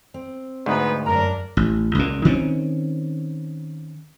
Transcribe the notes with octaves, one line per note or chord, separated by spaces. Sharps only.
C4
D2 G#2 B3 D#4 B4
F#2 D4 A#4 A#5
A1
C#2 A#2
D#3 C4 C#4